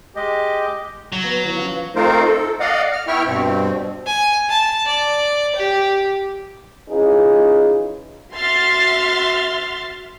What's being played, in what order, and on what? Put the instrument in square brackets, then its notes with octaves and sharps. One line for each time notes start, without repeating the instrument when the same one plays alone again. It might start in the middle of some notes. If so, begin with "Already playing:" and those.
[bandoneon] G#3 D#5 [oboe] G4
[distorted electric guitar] F#3
[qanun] B3
E3 B3
F3 C#4
[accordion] A3 C4 D#4 F4 A#4 C5
A4
D5 D#5 F5 F#5
F6
B3 E4 E5 G5 C#6 F6
G2 B2 C4
[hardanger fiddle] G#5
A5
D5
G4
[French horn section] E3 C#4 D#4 F4 G#4
[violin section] F#4 E5 C6 F6 A6